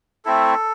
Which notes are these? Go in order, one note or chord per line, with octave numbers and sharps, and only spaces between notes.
A3 C4 E4 A4